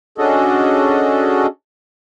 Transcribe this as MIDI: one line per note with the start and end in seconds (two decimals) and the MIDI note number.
0.18 1.46 61
0.18 1.46 62
0.18 1.46 66
0.18 1.46 68
0.18 1.46 69
0.18 1.46 75